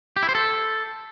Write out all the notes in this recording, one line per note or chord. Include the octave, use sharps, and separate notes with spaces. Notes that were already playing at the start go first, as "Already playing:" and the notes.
G4
E4
C5
A4